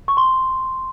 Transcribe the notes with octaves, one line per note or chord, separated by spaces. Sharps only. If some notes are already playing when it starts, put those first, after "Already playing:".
C#6
C6